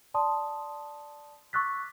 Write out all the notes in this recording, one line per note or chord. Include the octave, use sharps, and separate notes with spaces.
D5 A5 C6 D#6
C#6 D6 E6 F#6 A6 B6